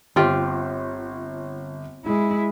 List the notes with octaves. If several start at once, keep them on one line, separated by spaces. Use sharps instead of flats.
G1 C4 F4 G4
G#3 E4